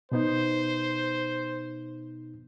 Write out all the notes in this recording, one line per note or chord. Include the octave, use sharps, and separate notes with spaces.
B2 B3 D#4 C5